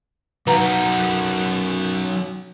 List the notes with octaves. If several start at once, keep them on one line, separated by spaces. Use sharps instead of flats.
F#2 F#3 D#4 B4 F5 F#5 A#5